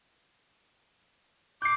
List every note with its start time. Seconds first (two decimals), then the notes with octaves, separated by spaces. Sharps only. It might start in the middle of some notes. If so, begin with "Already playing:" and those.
1.62 D6 G6 C7